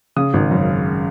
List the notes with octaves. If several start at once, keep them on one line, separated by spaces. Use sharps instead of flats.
C#3 D#6
G#1
F#2